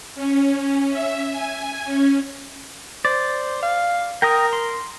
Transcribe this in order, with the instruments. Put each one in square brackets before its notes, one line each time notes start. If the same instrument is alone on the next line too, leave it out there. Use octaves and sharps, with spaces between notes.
[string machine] C#4
E5
G#5
C#4
[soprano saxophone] C5 [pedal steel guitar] D5
[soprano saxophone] F5
[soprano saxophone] A#4 [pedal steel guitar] G5 A#5 D#6
[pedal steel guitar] C6